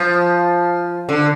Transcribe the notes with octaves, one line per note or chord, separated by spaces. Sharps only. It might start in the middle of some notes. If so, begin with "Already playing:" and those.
Already playing: F3
D3